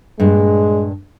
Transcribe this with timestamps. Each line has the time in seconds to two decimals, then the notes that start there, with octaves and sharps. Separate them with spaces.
0.20 G2 A#2 G#3 D4